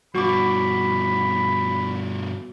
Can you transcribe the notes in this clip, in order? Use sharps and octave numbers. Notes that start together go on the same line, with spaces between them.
G2 B2 F#4 B5 C#6 D6